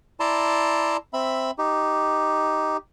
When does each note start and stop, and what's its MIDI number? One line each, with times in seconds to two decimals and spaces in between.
0.20 0.97 64
0.20 0.97 74
0.20 0.97 81
0.20 0.97 82
0.20 0.97 84
1.13 1.51 60
1.13 1.51 76
1.13 1.51 83
1.58 2.77 63
1.58 2.77 67